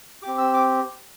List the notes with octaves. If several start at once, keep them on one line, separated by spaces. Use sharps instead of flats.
C4 G4 D6
E6
D6